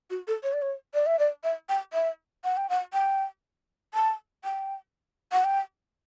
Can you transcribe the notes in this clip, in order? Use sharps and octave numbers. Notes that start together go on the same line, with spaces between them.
F#4
A4
C#5
D5
C#5
D5
E5
D5
E5
G5
E5
F#5
G5
F#5
G5
A5
G5
F#5
G5